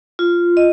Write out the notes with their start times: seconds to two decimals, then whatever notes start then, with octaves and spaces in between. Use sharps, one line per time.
0.19 F4
0.57 D#5